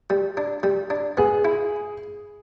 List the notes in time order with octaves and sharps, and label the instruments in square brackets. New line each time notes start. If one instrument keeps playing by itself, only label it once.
[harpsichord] G3
D4
G3
D4
[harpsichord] B3 [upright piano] G#4
[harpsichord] E4